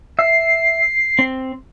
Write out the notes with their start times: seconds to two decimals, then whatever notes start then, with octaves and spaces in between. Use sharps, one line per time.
0.19 E5 C7
1.19 C4